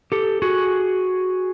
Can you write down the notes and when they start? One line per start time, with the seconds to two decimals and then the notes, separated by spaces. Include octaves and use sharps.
0.12 G4 A4
0.42 F#4 G#4